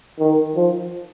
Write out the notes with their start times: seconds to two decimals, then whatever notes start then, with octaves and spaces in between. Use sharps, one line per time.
0.19 D#3
0.56 F3